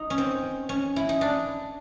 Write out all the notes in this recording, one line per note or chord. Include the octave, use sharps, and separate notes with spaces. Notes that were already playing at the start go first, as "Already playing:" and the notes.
Already playing: D#4
C#4
C4
C#4
E4
D#4
D4